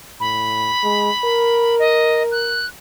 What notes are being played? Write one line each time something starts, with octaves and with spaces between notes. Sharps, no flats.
A2 B5
G#3
A#4
D#5
F#6